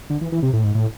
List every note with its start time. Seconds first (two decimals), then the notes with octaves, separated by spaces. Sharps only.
0.10 D3
0.21 E3
0.32 E3
0.43 C3
0.53 A2
0.64 G#2
0.75 A2